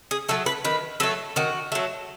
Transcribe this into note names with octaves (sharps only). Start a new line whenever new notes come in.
G#4
F#3 A3 A4
B4
D#3 B4
F#3 A3 A4
D#3 F#4
F#3 A3